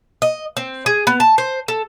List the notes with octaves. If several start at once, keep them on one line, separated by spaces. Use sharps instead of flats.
D#5
C4
G#4
B3
A5
C5
A4